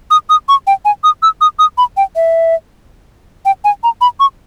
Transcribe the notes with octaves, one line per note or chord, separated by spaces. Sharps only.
D#6
D#6
C#6
G5
G#5
D#6
E6
D#6
D#6
B5
G5
E5
G5
G#5
A#5
B5
C#6